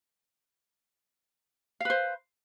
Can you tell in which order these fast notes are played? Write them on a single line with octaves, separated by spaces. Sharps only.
F5 B4 C5